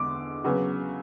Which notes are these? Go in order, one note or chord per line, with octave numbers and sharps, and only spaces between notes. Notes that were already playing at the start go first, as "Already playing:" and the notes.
Already playing: E2 D3 G#3 D6
C#3 F#3 B3